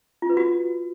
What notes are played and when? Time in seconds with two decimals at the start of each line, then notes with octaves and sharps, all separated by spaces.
0.22 F4
0.30 B4
0.37 F#4